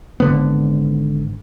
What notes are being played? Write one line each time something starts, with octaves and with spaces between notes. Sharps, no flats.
G#1 D3 B3